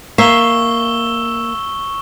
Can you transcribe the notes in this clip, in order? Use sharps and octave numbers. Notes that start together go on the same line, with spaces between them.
A#3 E5 F5 C#6 E6 G7